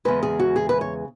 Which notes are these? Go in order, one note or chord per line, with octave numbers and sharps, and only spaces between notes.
E2 C#3 G#3 B4
G#4
F#4
G#4
B4
C#5